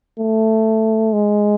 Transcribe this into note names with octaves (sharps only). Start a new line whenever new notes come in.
A3
G#3